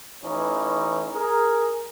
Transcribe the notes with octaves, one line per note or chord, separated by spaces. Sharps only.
A1 E3 C#4 D#4
G#4 A#4